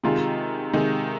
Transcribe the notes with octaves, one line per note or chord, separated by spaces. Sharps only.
C3 D#3 G#3 F4
C3 D#3 G#3 D#4